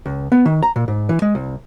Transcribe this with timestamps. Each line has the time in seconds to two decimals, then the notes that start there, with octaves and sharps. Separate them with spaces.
0.06 C#2
0.32 B3
0.46 D#3
0.63 A#5
0.76 A#2
0.88 G#2
1.09 E3
1.22 G#3
1.35 C2